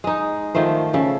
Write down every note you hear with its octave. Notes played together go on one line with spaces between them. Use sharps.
G#3 D#4
D#3 F3 A3 C5
C#3 A4